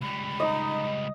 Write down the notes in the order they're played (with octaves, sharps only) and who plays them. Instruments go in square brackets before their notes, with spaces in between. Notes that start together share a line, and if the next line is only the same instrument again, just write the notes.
[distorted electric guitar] C#2 G3 [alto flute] B5
[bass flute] D#4 [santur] D#5